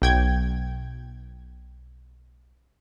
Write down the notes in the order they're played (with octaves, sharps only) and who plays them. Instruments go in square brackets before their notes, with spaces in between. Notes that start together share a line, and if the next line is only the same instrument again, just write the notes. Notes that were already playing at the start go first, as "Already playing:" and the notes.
[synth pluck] B1 G5 G#6